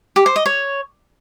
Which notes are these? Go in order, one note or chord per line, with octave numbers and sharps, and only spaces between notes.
G4
C5
D#5
C#5